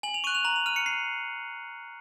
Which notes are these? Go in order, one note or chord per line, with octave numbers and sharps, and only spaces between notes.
G#5 F#7
F7
C#6 F#6 D#7
F7
A#5 F#7
F7
F6 D#7
C#7
C7